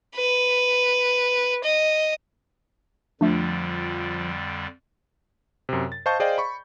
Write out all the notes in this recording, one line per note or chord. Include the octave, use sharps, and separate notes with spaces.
B4
D#5
F2 D3 F3 G3 A3 D4
F#2 C3
A6
C5 D#5 F5 A5 C#6 G6
G#4 C5 D5 D#5 F5 G5
B5 C#6